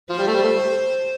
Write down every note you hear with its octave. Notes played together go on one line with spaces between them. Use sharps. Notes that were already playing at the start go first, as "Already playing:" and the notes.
F3 C5
G3
A3
G3
A3